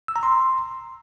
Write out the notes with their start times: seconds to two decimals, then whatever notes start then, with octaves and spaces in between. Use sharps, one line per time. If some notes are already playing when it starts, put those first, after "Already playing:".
0.08 E6
0.16 A#5
0.23 C6